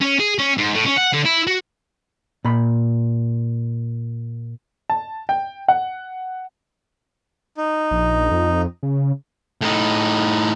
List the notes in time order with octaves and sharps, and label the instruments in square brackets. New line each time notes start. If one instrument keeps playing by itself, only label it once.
[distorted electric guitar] C#4
G#4
C#4
G#2
A2
C#4
F#5
D3
E4
F#4
[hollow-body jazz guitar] A#2 B5
[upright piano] A5
G5
F#5
[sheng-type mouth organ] D#4
[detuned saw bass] A#1
F2
C#3
[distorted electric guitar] A2 D#4